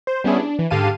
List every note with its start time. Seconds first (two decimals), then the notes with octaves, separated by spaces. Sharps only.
0.07 C5
0.24 G3 B3 C#4 D4 E4 G#4
0.39 D4
0.59 E3
0.70 G#2 D3 G4 F5 A5 D#7